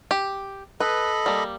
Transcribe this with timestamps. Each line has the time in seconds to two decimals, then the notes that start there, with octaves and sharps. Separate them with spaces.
0.11 G4
0.80 A4 B4 D#5 B5
1.26 G3 A#3